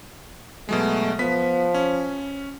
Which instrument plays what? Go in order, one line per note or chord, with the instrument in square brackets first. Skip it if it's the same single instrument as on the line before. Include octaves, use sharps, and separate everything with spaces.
[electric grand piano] B2 F#3 G#3 [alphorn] A3
[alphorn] F3 [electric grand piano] B3 B6
[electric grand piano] C#4